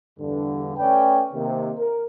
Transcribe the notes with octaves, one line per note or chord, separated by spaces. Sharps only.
E2 G2 D3
A3 C#4 B4 D5 G5
C3 D#3 A#3
A#4